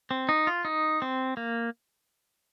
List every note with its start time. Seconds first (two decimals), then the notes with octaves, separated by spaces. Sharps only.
0.11 C4
0.29 D#4
0.47 F4
0.65 D#4
1.02 C4
1.37 A#3